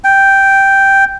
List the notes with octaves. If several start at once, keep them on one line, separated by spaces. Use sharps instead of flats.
G5